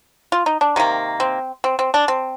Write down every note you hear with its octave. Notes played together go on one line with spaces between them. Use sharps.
F4
D#4
D4
C3 D#3 A#3
C4
C4
C4
D4
C4